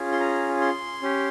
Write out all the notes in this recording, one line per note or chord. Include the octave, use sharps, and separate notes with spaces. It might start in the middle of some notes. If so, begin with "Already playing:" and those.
Already playing: C#4 F4 G#4
C6
A#5
C6
C#4 G4